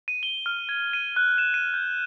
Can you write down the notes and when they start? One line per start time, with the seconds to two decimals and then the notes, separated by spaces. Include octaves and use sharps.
0.08 D#7
0.23 G7
0.46 F6
0.69 G#6
0.93 D#7
1.16 F#6
1.38 E7
1.54 D#7
1.74 G6